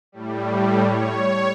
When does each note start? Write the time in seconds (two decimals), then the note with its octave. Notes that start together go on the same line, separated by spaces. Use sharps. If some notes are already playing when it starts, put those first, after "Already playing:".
0.12 A2 G3
0.83 C#5